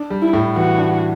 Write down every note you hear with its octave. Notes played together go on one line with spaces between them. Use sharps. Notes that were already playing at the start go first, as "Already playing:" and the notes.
Already playing: D4
G3
E4
A2
E3 F#4
D4